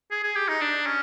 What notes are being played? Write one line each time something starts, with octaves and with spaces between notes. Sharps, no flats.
G#4
G#4
G4
D#4
D4
C#4